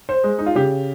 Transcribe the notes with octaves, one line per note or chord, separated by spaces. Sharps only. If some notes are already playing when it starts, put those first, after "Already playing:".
C5
G#3
D#4
F4
C#3 G4